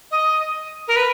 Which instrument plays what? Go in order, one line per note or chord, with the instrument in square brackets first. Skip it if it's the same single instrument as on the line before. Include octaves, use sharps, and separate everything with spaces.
[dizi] D#5
A#4
B4